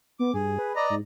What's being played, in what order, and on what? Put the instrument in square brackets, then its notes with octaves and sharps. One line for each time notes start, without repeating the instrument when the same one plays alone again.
[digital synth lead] B3 [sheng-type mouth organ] D6
[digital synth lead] G2 [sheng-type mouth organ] G#4
[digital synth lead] B4
[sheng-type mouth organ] D5 D#5 A#5
[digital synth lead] G#2